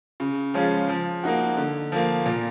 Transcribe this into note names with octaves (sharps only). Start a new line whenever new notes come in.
C#3
F3 G#3 C#4 F4
F3
A#3 D#4 F#4
D3
F3 A#3
A#2